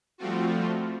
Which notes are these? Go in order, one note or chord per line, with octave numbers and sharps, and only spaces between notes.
F3 G3 A3 C4 F4 F#4